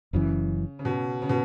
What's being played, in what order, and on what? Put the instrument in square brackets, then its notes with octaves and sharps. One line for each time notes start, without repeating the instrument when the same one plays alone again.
[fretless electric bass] F#1 F#2 E3 [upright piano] C#3
[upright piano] C#3
B2
C#3
B2